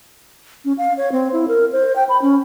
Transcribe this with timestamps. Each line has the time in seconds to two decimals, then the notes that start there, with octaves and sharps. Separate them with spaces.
0.65 C#4
0.78 F5
0.97 C#5
1.12 C4
1.33 E4
1.48 A#4
1.72 C5
1.96 G5
2.09 B5
2.22 C#4